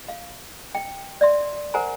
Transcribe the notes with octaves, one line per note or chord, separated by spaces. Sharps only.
F5
G5
D5 E5 C6
A#4 C5 F#5 G#5 A#5